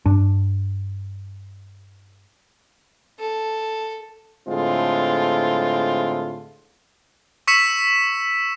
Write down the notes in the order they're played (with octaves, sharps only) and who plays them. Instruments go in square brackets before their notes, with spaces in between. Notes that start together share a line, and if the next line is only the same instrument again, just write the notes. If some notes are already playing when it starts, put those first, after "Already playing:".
[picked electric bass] G2 D4
[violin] A4
[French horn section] A2 D3 G#3 C4 F4
[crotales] C#6 E6 B6 C#7 E7